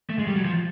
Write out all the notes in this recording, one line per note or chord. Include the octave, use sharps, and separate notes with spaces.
A3
G#3
G3
F#3
F3